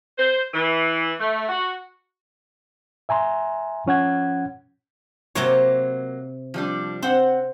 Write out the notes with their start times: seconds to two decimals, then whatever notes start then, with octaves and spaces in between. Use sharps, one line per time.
0.17 C5
0.54 E3
1.20 A3
1.49 F#4
3.09 E5 G#5 A#5 C6
3.86 F3 C#4 F#5 G#6
5.35 C3 F#3 A#3 C5 C#5
6.54 F3 G3 D4
7.02 C4 C5 F#5